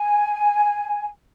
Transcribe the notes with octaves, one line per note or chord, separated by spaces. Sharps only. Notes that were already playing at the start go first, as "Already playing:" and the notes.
Already playing: G#5